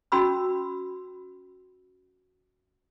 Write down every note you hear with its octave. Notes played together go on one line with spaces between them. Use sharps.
C#4 F#4 B5 E6